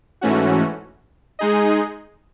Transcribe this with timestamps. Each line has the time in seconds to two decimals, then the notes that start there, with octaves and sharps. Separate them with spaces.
0.21 G#2 E3 A3 C#4 F#4
1.39 G#3 D#4 G#4 D#5